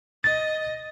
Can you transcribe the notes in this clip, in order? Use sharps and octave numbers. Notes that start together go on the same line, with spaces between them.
D#5 A6